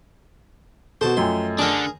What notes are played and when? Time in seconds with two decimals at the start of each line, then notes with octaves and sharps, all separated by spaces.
1.01 B2 F#4 A4 C5 A5
1.17 F#2 F3 A3 D#5 G5 C6
1.59 D3 D4 G#4 A#4